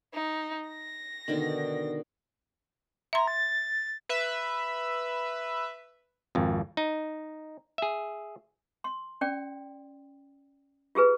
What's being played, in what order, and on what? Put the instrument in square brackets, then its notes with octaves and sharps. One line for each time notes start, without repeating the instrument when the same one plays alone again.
[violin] D#4
A#6
[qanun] B2 D3 D#3
[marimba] E5 C6 [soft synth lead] A#5
[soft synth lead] A6
[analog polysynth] B4 E5
[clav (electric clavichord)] G#1 F2
D#4
G#4 E5
[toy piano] C6
C#4 D5 G5
F4 G4 G#4 B4